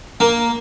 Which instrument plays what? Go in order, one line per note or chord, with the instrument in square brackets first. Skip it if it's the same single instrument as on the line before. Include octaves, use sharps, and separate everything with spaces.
[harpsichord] A#3